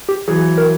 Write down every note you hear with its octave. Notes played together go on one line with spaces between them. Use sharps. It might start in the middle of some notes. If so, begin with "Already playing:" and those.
G4
E3 F#3 G#4
A#4